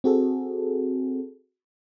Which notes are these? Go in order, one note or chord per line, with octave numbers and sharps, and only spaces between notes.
C4 F#4 G#4 A4